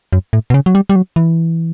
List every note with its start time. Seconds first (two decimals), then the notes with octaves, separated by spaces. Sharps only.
0.13 F#2
0.33 A2
0.50 B2
0.54 C#3
0.66 F#3
0.75 G3
0.90 G3
0.96 F#3
1.16 E3